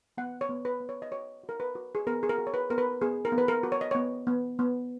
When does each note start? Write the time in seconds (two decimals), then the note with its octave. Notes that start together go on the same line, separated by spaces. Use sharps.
0.18 B3 F#5
0.41 C#5
0.49 B3
0.65 B4
0.80 B3
0.89 C#5
1.02 D#5
1.11 F#4 C#5
1.43 F#4
1.49 A#4
1.60 B4
1.75 F#4
1.95 G#4
2.07 B3 A#4
2.23 G#4
2.29 A#4
2.38 F#4
2.47 C#5
2.54 B4
2.70 B3 A#4
2.78 B4
3.01 B3 G#4
3.25 A#4
3.32 B3
3.38 B4
3.48 A#4
3.63 F#4
3.72 C#5
3.81 D#5
3.91 B3 C#5
4.27 B3
4.59 B3